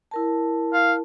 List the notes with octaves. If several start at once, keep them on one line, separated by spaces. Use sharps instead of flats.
E4 A#4 A5
F5